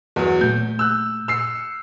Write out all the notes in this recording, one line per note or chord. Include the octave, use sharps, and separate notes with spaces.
E2 F#3
A#2 A3 G6
E6 F#6
E6 F6 C7 C#7